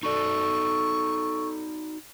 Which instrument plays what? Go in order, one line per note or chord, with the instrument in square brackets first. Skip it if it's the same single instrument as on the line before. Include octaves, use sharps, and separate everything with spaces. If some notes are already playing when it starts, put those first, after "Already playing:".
[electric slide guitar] D#4 F#4 D5 [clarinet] A4 [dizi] C#6